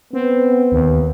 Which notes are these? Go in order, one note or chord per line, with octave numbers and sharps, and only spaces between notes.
B3 C4
D#2